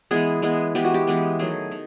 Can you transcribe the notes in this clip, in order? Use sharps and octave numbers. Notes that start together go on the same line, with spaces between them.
E3 G#3 B3 G#4
E3 G#3 B3
E3 G#3 B3 G4
F#4
G4
E3 G#3 B3
D#3 F#3 A3 G#4
D#3